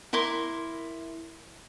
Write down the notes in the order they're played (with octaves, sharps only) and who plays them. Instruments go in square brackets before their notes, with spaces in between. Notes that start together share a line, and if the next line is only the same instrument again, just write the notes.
[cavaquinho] E4 A#4 C6 D6